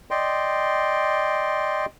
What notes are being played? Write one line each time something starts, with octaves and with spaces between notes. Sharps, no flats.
D5 D#5 G5 C6